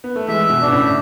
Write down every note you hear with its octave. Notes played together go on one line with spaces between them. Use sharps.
B3
A3
E3 G#3 E5
B2
B2 D4
A2 C#3